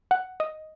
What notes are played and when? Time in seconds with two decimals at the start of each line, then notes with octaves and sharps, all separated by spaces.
0.11 F#5
0.40 D#5